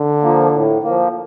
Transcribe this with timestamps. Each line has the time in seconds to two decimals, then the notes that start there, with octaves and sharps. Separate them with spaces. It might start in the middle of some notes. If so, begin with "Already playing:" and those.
Already playing: D3
0.23 F3 A#3
0.53 A2
0.84 F3 A#3